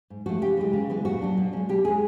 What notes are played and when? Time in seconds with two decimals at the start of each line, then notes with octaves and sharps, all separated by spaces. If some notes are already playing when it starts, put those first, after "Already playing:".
0.10 G#2
0.26 F3 A3 F#4
0.41 C#3 G4
0.57 E3 G#3
0.73 C#3
0.89 E3 G#3 B3
1.05 A#2 F#4
1.21 F#3 A#3 D4
1.37 B2
1.53 G#3 C#4
1.69 B2 G4
1.84 G#3 C#4 G#4